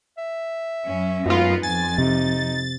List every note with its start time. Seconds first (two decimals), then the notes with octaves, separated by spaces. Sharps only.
0.18 E5
0.85 F#2 C#4
1.26 F#2 G#3 B3 D#4 F4
1.63 F2 G#5 A6
1.98 C3 D#4